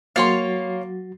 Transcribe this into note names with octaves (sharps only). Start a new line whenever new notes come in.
F#3 A#3 F#4 C#5 F5 C6 A6